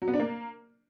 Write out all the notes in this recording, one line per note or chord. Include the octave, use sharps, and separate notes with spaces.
F#3
B3
D4
A#3